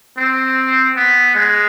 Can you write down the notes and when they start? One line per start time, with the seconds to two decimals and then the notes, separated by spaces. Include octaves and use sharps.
0.18 C4
0.96 B3
1.35 G#3